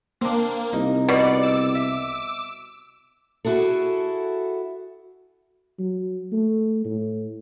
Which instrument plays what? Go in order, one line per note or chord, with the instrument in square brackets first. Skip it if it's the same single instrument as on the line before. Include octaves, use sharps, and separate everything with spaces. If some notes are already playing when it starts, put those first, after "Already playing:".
[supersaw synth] A#3 [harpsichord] C4 D4
[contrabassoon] C2 [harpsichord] D#4
[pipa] B2 [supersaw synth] D5 C#7
[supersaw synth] D6 E6
[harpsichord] E5
[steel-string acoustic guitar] E4 F#4 G#4 A4
[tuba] F#3
A3
A2